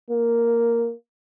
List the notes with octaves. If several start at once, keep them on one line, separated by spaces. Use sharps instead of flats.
A#3